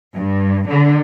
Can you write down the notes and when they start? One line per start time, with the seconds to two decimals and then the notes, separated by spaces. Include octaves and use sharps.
0.16 G2
0.69 D3